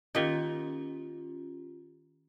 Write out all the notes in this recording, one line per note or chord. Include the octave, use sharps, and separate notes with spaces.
D#3 A#3 C#4 D#4 F4 G4